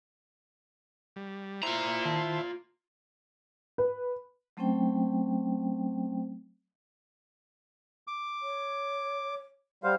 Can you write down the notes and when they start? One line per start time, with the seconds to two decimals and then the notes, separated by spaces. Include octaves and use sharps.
1.16 G3
1.63 E4 F4 C5 A#5
2.05 D#3 A5
3.78 B4
4.57 F#3 A3 C4 C#4 C5 G5
8.07 D6
8.42 C#5
9.84 G3 C5 F5 F#5